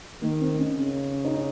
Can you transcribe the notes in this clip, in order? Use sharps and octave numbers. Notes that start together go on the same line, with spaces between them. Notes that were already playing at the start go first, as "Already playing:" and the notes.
D#3 A#3
C4
C#4
C#3
D#4
C#4